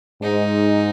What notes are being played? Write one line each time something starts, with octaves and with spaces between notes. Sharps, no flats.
G#2 D#4